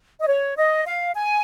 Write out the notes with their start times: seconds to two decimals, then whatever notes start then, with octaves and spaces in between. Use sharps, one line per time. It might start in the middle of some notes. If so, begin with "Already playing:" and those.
0.21 D#5
0.27 C#5
0.57 D#5
0.86 F5
1.15 G#5